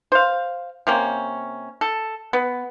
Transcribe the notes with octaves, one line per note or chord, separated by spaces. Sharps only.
C5 F5
C3 A#3 C#4
A4
B3